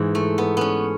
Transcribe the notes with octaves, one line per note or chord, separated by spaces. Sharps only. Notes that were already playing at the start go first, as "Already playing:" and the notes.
Already playing: G#2 E3
A3
B3
B3 C#4